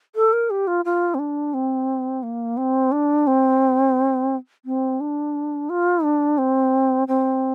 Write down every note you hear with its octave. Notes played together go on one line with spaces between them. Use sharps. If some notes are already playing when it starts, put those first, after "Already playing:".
A4
A#4
G4
F4
F4
C4
D4
C4
A#3
C4
D4
C4
C4
D4
F4
D4
C4
C4